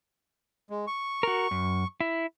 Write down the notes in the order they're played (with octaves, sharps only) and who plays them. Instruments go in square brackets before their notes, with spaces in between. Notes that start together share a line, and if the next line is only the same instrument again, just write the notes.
[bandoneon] G#3
C#6
[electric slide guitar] F#4 A#4
F#2
E4